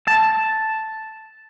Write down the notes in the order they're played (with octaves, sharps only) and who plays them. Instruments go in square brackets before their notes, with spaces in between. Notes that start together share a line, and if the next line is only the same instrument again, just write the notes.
[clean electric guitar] A5